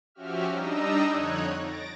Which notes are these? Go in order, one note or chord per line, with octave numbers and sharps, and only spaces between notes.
F3 C#4 F#4 G4 E5 F6
G3 D4 D#4 D#5 A#5 E6
F2 D3 D#4 C#5 F#6 G#6
A6 A#6 D7